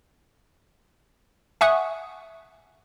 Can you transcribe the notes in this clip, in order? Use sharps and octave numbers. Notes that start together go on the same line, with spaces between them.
E5 F#5 G#5 C#6 D#6 F#6